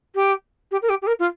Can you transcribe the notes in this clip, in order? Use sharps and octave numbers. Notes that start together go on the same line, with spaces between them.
G4
G4
A#4
G4
G4
A#4
F4